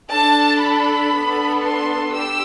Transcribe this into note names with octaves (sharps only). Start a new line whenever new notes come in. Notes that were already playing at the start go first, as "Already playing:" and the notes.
D4 A4 A5
B5
B3 D4 A4
C6
G4 E6